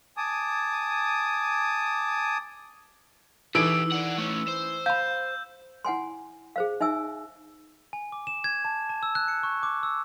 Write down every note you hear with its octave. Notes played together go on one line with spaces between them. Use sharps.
G#5 A5 D6 D#6
E3 G3 D#4 E4 G#4 A4 E6 D7
D5 F#5
A3 C#4
C5
F5 B5 G6
E4 F#5 G#5 C6
G#4 C5 F5
D#4 E5 G#5 E6
G#5
D6
E7
G#6
A5
A5
E6
F#6
C#7
C#6
D6
E6